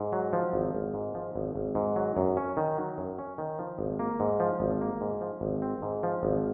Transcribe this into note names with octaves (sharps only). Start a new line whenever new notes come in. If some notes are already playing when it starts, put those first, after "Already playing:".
Already playing: G#2
F#3
F3
G#1
G#1
G#2
F3
G#1
G#1
G#2
F#3
F#2
C#4
D#3
F#3
F#2
C#4
D#3
F3
G#1
A#3
G#2
F3
G#1
A#3
G#2
F3
G#1
C4
G#2
F3
G#1